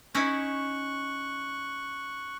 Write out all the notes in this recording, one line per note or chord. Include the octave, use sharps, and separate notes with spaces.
C#4 D#4 E4 C#6 F#6